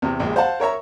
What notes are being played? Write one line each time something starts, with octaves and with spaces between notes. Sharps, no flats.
E2 C3
A#1 D#2 G#3
C5 F5 F#5 A5
A#4 C#5 E5 A#5